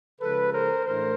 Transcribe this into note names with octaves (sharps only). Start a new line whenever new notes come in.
C#3 F3 G#3 A4 B4
A#4 C5
A2 E3 A3 D4 A#4 C5